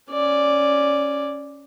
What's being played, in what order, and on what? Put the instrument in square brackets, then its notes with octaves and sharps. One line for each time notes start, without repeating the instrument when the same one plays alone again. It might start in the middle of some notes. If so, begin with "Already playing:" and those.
[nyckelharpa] C#4 D5